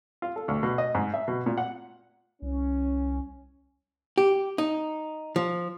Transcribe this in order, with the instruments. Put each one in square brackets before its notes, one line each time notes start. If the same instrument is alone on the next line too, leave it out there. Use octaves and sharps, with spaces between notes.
[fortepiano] F4
A4
D2
B2
D#5
G#2
E5
B2
A#2
F#5
[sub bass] C2 [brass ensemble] C#4
[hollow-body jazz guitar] G4
D#4
F3